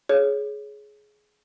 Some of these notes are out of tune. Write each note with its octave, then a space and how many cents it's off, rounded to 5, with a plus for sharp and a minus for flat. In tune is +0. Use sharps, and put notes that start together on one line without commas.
G#4 +15 C#5 +0